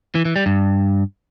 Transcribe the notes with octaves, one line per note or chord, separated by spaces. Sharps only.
E3
E3
G3
G2